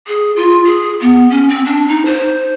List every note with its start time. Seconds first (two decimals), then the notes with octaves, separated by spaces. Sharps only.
0.08 G#4
0.36 F4
0.65 G#4
1.01 B3
1.31 C#4
1.49 C4
1.65 D4
1.88 D#4
2.06 C5